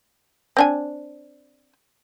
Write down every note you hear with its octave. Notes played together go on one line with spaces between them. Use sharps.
C4 D4 G#5